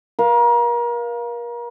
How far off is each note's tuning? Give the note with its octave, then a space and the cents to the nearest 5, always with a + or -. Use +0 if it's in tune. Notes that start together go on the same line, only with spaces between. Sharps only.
A#4 +35 F5 +0